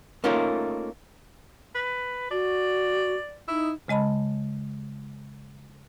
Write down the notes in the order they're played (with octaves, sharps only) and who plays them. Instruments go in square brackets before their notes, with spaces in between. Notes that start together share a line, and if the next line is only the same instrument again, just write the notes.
[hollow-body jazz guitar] A3 A#3 C#4 D#4 F4 A#4
[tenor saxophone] B4
[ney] F#4 [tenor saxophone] D5
[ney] D#4 [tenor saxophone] E4
[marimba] C#3 G#3 D#5 A5 B5